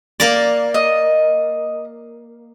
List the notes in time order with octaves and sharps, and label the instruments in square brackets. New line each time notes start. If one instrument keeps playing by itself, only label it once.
[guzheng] A#3 A#4 D5
[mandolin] D#5